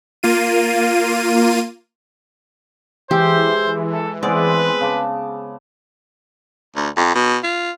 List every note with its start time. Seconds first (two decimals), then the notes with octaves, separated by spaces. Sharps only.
0.23 A#3 F4 D#7
3.11 E3 G#3 G4 C5 E5
3.92 A4
4.23 G#3 B3 C4 B4 D5
4.81 C#3 A5 D6
6.76 D2
6.97 F2
7.15 B2
7.43 F4